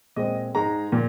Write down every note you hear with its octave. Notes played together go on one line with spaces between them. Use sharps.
A#2 G#3 C4 D#5
G#2 G#3 D#4 A#5
A#2